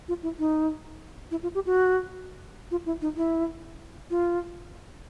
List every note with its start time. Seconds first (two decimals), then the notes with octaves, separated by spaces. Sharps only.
0.08 F4
0.23 E4
0.39 D#4
1.31 E4
1.43 F4
1.55 G4
1.66 F#4
2.71 F4
2.86 E4
3.01 D#4
3.17 E4
4.10 F4